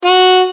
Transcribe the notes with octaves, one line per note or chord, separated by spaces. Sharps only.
F#4